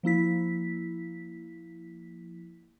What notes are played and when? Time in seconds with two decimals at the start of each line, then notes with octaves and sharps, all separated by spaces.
0.03 F3 A#3 E4 B6